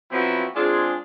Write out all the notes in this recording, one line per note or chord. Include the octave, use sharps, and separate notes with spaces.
F3 F#3 B3 C4 E4 F#4
G#3 C4 D4 F4 G#4